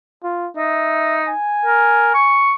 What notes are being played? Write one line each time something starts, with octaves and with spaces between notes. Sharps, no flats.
F4
D#4 E5
G#5
A#4
C#6